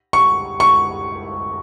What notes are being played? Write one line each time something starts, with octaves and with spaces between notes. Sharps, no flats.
C#6
C#6